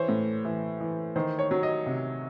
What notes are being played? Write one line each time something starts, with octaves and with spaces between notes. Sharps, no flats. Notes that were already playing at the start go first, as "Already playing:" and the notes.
Already playing: E3 C5 C#5
A2
E3
E3
D#3 C5
C#5
F#3
D#5
C3